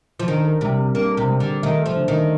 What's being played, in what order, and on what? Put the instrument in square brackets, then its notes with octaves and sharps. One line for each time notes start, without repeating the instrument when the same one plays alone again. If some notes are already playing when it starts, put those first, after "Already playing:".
[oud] F3
[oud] D#3 [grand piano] D4
[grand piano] A#4
[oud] C3 [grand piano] G3
[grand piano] G4
[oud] A#3 [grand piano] D4
[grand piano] A#4
[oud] C3
[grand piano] G3
[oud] D3
[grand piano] G4
[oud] D#3 [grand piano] A3
[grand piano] A4
[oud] F3
[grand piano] D3
[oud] D#3
[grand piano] D4